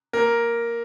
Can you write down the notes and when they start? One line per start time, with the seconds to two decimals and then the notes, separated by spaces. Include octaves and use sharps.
0.13 A#3 A#4